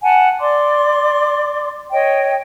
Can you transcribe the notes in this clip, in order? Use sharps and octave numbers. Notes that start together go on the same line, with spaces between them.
F#5 G#5 A5
D5 C6 D6
C#5 D#5 G5